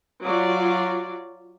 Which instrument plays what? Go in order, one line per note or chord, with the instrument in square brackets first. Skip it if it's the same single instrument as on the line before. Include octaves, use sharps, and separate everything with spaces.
[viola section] F#3 F4 D5